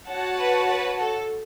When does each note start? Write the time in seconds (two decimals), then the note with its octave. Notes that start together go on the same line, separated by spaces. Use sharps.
0.09 F#4 C#5 F#5 A5
0.39 B4
0.70 B4
1.00 A4